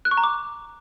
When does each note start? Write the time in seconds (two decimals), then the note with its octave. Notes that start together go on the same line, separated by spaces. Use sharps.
0.05 F#6
0.11 C#6
0.17 A#5
0.24 D6